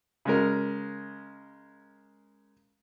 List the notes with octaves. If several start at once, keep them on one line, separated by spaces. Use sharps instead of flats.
C#3 G#3 A#4